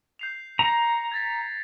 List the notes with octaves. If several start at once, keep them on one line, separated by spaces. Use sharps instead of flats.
G6 C7 F7
A#5 A#6 C#7 F7
G#6 A6 B6